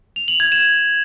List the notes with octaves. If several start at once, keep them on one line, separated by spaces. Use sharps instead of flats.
F7
F#7
G#6
E7